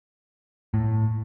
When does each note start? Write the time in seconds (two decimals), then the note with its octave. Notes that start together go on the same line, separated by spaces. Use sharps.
0.74 A2